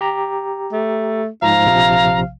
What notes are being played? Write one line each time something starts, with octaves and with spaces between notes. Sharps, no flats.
G4 A#5
A3
G#2 F3 F5 A#5
A#1 C3 F3